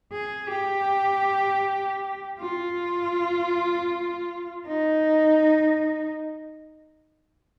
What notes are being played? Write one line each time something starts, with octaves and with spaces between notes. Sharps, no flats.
G#4
G4
F4
D#4